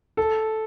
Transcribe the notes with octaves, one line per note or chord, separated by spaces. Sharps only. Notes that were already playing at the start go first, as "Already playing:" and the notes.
A4